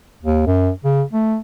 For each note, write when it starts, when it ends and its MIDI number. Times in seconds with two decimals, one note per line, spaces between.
0.23 0.43 39
0.46 0.71 42
0.84 1.03 49
1.13 1.37 57